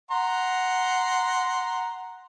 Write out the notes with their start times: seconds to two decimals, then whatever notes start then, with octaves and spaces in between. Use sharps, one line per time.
0.11 F#5 A#5 C6